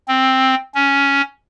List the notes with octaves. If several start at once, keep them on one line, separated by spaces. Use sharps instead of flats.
C4
C#4